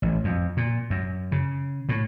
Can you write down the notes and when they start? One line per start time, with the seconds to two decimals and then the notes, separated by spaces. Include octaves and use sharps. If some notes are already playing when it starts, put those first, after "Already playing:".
0.02 A1
0.24 F2
0.57 A#2
0.90 F#2
1.32 C#3
1.89 A2